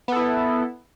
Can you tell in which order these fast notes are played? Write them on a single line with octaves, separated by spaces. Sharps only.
B3 A4 E4